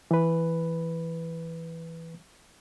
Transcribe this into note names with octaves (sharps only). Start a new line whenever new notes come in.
E3 B4